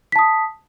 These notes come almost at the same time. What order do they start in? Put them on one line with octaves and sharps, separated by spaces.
B6 A5 D#6